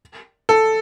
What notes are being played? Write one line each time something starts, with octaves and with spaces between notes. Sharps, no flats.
A4